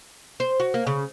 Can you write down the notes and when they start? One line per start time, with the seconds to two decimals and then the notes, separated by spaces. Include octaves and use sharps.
0.40 C5
0.60 F#4
0.74 A#3
0.87 C#3